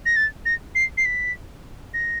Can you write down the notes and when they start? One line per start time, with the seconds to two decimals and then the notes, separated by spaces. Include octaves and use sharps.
0.06 A#6
0.16 A6
0.46 A#6
0.75 C7
0.97 C7
1.05 B6
1.94 A#6